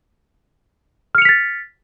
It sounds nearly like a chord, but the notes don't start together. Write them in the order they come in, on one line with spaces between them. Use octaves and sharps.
F6 C#7 F7 B6 A6